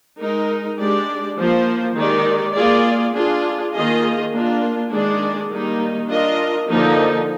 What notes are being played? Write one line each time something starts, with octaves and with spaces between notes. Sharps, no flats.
G#3 D#4 A#4
G#3 D4 G4 D5
F3 A#3 F4 C5
D#3 G#3 D#4 G4 D5
A#3 F4 G#4 D5
D4 F4 G#4
D#3 A#3 F4 G#4 D#5
A#3 D4 F4
D#3 G#3 D4 G#4 D5
D#3 G3 A#3 D#4
D4 F4 A#4 D#5
D3 F3 A#3 D#4